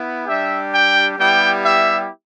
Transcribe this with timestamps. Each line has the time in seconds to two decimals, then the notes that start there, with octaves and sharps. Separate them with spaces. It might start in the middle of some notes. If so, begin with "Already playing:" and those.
Already playing: B3 E4
0.27 G3 D4 G4 E5
0.73 G5
1.19 G3 B3 E4 G4 G5
1.65 E5